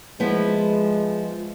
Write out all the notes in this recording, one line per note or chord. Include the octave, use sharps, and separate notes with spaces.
F3 G#3 B3 E4